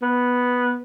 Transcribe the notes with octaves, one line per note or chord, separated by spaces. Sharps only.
B3